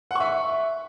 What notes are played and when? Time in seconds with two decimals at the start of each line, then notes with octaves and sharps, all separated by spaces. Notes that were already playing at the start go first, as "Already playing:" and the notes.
0.11 F#5
0.15 C#6
0.20 E5